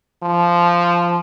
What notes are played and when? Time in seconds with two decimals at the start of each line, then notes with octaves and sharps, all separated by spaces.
0.23 F3